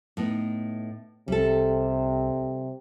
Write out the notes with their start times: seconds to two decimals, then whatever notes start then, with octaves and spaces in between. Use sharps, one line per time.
0.17 A2 B3 D#4
1.28 C2 C3 G3 A4